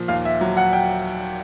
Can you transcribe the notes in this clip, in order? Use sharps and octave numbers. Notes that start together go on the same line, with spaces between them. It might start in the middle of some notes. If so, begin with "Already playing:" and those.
Already playing: A#2 F3
D#2 F5
E5
F#3
F#5
G5